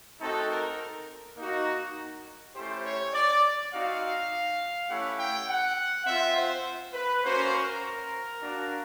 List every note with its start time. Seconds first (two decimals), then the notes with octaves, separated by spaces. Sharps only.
0.20 A3 C4 D#4 F#4 A4
0.49 A#4
1.37 A#3 D#4 F#4
2.54 A3 C#4 E4 G4 C5
2.84 C#5
3.12 D5
3.71 C4 D#4 F#4 F5
4.88 A3 C#4 E4 G4 F#5
5.18 G5
5.47 F#5
6.06 C4 F4 E5
6.35 C5
6.93 B4
7.23 A#3 C#4 F#4 C5
7.52 A#4
8.40 A#3 D4 F#4